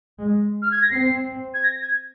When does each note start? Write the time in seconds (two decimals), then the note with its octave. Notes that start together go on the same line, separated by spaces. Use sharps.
0.19 G#3
0.62 F6
0.71 G#6
0.82 A#6
0.91 C4 C7
1.54 G#6
1.63 A#6
1.81 G#6